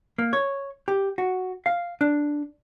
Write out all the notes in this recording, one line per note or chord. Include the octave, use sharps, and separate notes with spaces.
A#3
C#5
G4
F#4
F5
D4